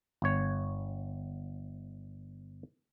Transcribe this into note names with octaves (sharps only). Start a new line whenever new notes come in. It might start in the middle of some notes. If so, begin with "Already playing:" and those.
G1 C#5